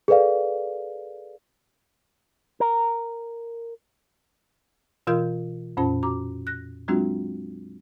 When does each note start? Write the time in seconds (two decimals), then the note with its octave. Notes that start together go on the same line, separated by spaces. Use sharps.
0.08 G#4 A4 B4 D5 F5
2.60 A#4
5.07 B2 E3 F4 A#4 F5 G6
5.77 F2 A#2 C#4 F4 C5 A5
6.03 F#4 A#5 D6
6.47 F#6 A#6
6.88 F#3 G#3 C4 D4 F4 F#4